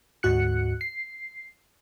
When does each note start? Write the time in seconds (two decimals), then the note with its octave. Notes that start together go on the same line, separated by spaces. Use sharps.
0.23 D2 G#2 F#4 F#6 C#7
0.81 C7